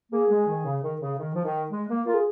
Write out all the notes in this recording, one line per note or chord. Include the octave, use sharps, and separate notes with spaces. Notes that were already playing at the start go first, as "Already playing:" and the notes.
A#3 G#4
G#3
D#3
C#3
D#3
C#3
D#3
F3
D#3
G#3
A#3
F4 A#4
G#4